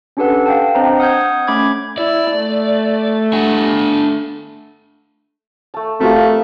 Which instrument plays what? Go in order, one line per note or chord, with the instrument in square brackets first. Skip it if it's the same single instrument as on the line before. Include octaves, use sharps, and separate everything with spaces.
[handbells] C#4 D4 G4 A4 B4 F#5
F5 G5 A5
C4 D4 C5 D#5 A#5
F#5 D#6 F6 G6 G#6
A3 C#4 B5 D6 G#6
[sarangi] E4 [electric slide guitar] D5
[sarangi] A3
[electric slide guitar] D4 F#5 G#5
[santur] A3 A5
[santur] F3 A#4 [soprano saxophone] A3 [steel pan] C4 F#4 G4